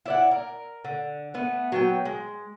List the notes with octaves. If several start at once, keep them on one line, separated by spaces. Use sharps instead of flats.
E4 D5 F#5
A#4
D3
A3 B3
F#3 B3 G5
G#3